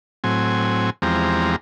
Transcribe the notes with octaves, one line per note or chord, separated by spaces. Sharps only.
A2 F#3 C4 G#5
E2 F3 G#3 C4 G4 A#5